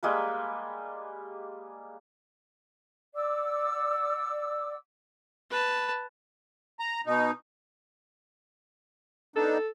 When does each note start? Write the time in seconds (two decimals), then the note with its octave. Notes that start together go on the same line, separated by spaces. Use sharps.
0.03 G3 G#3 A#3 B4
3.15 D5 F#5 D6 E6
5.50 B4 A5
6.80 A#5
7.06 B2 D#4
9.36 B3 D4 D#4 A4